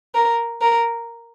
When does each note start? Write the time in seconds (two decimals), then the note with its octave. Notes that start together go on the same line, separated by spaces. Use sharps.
0.15 A#4
0.61 A#4